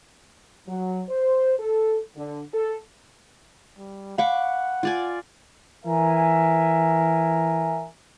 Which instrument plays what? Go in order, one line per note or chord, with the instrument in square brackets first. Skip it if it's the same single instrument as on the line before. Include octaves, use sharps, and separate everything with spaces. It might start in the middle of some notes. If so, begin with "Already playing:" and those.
[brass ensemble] F#3
C5
A4
D3
A4
[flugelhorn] G3
[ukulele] F5 [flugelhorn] F#5 [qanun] B5 C#6 D6
[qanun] F4 D5 G#5
[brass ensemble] E3 A#4 E5 G#5